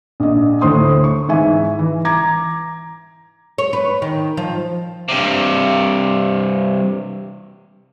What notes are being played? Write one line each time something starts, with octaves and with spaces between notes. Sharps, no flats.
A#1 D#5
D2 A2 C5 C6 D#6
C#6
G#2 E3 E5 G#5
E3
A#5 D6 G#6 A#6
C#5
B4
D#3
F3
G2 C3